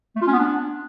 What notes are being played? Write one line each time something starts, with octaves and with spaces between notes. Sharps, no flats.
A3
F4
C#4
B3
D4